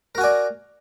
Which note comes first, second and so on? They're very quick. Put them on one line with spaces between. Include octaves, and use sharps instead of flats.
A#4 F#4 G#5 D5